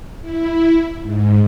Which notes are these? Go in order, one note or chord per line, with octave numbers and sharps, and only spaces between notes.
E4
G#2